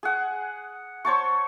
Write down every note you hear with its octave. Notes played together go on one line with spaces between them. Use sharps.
G#4 F#5
C5 C#5 A5 C#6